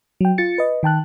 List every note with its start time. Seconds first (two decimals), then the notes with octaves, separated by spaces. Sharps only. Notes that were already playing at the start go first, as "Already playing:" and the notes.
0.21 F#3 G5
0.38 F4 A6 C#7
0.58 B4 D#5
0.83 D#3 G5 A5 F#6